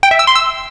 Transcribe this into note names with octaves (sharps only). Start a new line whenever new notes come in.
G5
E5
E6
C6
E6